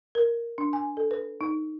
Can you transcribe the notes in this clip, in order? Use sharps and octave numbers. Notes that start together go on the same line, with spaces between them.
A#4
D4
G#5
A4
B4
D#4